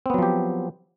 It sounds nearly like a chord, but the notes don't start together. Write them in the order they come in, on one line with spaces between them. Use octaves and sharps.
C4 B3 F#3 F3 G4